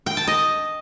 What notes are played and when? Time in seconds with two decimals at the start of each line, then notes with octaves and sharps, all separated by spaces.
0.06 G5
0.17 A5
0.28 D#5